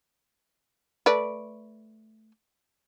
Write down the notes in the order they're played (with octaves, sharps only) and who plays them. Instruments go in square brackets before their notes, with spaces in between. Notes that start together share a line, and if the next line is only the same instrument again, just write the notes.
[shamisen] A3 B4 D5